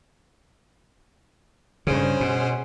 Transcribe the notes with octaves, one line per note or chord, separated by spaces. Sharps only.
G2 C#3 C#4 G#4 C5
B2